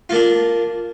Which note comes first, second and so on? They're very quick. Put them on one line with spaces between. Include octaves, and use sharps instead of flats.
F4 A#3 D4